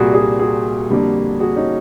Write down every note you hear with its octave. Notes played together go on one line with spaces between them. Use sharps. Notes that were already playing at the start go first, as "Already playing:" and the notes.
Already playing: C2 A#2 G3 A#3 F#4 G#4
F#4 G#4
F#4 G#4
F2 D3 G3 A#3
F#4 G#4
C#4 D#4